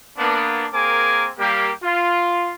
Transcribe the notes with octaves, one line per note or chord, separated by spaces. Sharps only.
A#3 B3 D4
A#3 C4 G#4 A#4 G#5 D6
G3 A#3 G4
F4